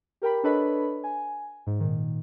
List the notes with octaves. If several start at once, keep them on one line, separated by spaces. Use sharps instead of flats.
G4 A#4 G5 B5
D4 A4 B4 C#5 D#5 B5
G#5
G#2
A#2 D#3